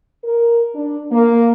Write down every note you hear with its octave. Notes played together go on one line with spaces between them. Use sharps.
A#4
D4
A#3